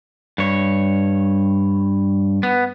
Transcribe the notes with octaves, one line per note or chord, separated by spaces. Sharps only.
G2 C#5
B3